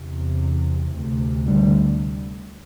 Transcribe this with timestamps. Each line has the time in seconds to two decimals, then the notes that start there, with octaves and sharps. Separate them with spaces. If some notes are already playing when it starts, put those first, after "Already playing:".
Already playing: E2 C3
0.95 D2 C3
1.46 D3 G3